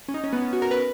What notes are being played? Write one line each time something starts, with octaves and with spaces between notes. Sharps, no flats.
C#4
D#4
C#4
B3
C#4
F#4
A#4
B4